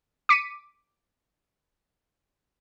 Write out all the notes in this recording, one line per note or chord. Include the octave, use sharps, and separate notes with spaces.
D6 B6 C#7 D#7